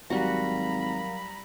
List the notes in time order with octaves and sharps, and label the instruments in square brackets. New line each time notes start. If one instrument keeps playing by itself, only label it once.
[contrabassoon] G#1 [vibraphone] F#3 A#4 F5 [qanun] G3 F#4 [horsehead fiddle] A#5 B5